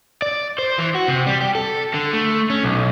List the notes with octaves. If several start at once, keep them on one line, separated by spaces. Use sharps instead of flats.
D5
C5
E3
F#4
C3
G3
G4
A4
D3
A3
C#4
B1